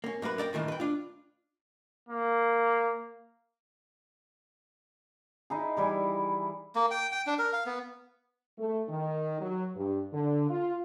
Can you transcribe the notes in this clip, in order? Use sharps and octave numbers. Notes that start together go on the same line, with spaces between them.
A#3 C#4
F#2 A#3 A#4 B4 F#5
A#4 D5 F5 G5
G2 A#2 D#3 E3
B4 G5
D4 F4
A#3
D#4 E4 G#4
E3 G3 E4 G#5
A#3
G5
G5
D4
A#4
F5
B3
A3
D#3
F#3
G2
D3
F4